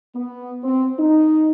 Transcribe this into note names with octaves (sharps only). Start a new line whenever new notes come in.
B3
C4
D#4